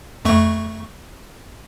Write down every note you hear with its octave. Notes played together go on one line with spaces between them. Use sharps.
F2 A3 C#6